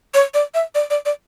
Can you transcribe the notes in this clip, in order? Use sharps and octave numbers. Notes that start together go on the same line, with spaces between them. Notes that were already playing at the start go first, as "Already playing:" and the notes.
C#5
D5
E5
D5
D5
D5